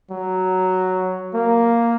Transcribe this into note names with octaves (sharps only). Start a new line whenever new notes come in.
F#3
A#3